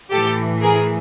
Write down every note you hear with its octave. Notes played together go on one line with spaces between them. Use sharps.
A2 E3 G4 A4
G#4 A#4